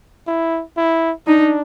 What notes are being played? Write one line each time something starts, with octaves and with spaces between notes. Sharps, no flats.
E4
E4
D4 D#4